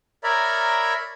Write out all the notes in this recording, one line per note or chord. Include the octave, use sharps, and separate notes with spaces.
A#4 C#5 D5 E5 A#5 B5